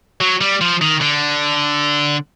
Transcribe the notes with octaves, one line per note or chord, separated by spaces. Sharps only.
F#3
G3
F3
D#3
D3